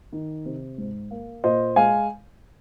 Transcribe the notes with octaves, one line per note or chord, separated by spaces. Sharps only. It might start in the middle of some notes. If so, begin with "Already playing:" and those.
D#3
C3
G#2
A#3
A#2 C5 D#5
G#3 F5 G#5